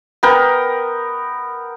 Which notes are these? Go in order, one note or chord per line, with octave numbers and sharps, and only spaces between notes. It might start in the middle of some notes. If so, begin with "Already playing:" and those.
B3 A#4 G5